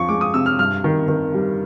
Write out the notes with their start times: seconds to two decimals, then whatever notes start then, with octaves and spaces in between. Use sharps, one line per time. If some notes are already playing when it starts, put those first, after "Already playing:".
Already playing: F2 F3 C#6
0.09 G#3 D6
0.21 D#6
0.34 C3 E6
0.46 F6
0.59 G2 F6
0.84 D#3
1.08 D#3
1.34 G3